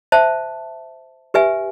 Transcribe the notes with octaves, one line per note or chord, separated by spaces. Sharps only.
C5 E5 A5
G4 B4 E5 G#5